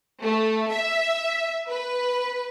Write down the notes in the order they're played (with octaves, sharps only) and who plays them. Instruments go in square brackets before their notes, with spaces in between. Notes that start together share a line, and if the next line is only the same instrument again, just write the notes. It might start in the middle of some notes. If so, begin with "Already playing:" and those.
[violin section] A3
E5
B4